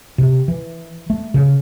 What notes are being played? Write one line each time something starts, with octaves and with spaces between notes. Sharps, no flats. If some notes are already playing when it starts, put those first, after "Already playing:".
C3
E3
A3
C#3